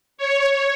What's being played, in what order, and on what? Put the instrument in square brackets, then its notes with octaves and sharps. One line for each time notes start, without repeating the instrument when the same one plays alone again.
[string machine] C#5